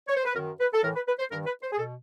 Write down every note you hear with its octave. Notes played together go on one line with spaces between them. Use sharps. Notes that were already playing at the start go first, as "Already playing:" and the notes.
C#5
C5
B4
F#2 D#3 A#4
B4
A4
A2 E3 A#4
B4
B4
C5
G2 D#3 A#4
B4
C5
G#4
B2 A4